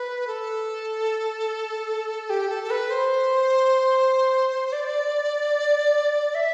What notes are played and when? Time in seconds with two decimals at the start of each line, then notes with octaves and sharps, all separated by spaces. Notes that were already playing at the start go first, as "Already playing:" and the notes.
Already playing: B4
0.27 A4
2.30 G4
2.50 A4
2.64 A4
2.70 B4
2.90 C5
4.73 D5
6.35 E5